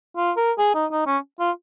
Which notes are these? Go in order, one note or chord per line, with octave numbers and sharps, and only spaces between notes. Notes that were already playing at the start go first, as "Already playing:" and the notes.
F4
A#4
G#4
D#4
D#4
C#4
F4